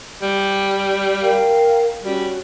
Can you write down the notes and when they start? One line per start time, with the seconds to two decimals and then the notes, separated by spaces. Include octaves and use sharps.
0.22 G3
1.22 A#4 F5 G5
2.04 G3 C#4 F#4